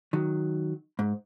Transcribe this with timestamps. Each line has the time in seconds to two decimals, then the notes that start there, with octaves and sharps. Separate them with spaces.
0.13 D#3 F#3
0.99 G#2